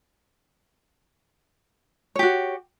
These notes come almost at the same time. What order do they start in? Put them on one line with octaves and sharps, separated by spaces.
C#5 G4 F#4